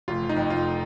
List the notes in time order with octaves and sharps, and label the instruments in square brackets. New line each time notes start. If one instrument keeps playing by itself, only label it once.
[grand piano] F1 [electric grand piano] F4
[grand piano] F3
[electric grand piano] D#4
[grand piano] F2
[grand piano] F1 [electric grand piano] F4